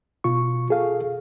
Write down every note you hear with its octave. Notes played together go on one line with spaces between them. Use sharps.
B2 F4 C#6
G#4 A4 F5